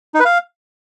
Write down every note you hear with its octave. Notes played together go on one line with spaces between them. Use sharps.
D#4
B4
F5